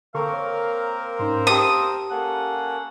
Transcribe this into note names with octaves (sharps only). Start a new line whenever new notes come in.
D3 A#3 C4 A4 A#4 F5 C#6
C#5
G#2 C#4 D#4 C5
G4 G5 A5 D#6
A#3 C#4 A4 F#5